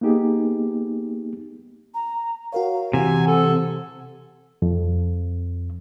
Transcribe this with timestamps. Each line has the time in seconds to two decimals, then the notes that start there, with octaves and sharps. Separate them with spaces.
0.01 A#3 B3 D#4 G4 G#4
1.94 A#5
2.52 F#4 A#4 C#5 F5
2.93 C3 E3 F#5 G#5
3.27 A4
4.62 F2